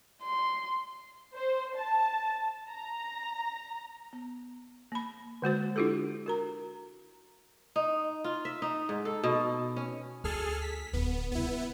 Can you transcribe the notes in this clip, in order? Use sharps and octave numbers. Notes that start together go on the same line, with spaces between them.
C6
C5
A5
A#5
B3
A#3 B5
D3 G#3 F#4 C5
D4 E4 F4 G4 A4
F#4 A#4 A#5
D#4
F4
E5
D#4
G#2
A4
B2
C#4
D2 G#4 A4 F6
B6
D1 D3 B3
C#3 G3 B3 E4